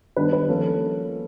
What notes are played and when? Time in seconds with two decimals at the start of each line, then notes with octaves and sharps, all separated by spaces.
0.16 D#3 G3 B3 D4 B4
0.33 B4
0.49 F3 A#3 C#4 A4